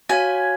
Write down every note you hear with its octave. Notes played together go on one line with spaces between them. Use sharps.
F#4 C#5 F5 G#5